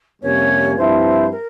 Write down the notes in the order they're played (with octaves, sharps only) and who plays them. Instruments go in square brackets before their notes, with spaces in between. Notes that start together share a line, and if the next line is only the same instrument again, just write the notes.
[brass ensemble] F2 C3 G3 A#3 C#4 [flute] C#5
[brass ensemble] G2 F3 C4 E4 [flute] C5
[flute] A#4